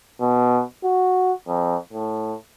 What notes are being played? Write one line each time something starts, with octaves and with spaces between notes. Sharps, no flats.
B2
F#4
F2
A2